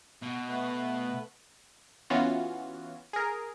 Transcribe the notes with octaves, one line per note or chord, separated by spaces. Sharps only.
B2
A3 B3 B4
E3 B3 C#4 F4 F#4
G#4 A#4